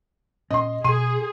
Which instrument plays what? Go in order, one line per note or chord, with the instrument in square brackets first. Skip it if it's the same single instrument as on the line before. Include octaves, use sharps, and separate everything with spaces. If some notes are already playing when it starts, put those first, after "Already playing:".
[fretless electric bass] A#2 C#4 [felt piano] D#5 C6
[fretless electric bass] B2 [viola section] G#4 [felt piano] C6 D#7